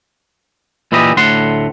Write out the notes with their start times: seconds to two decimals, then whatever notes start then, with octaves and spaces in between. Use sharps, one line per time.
0.92 A#2 E3 E4 G4 D#5
1.17 D2 A2 F#5 C6